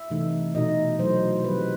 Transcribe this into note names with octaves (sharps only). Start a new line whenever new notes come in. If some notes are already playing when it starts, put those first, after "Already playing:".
Already playing: E5
C3 E3 A3 D#4
B2 A3 D#4 D#5
F#3 A3 E4 C5
D#3 G3 C4 B4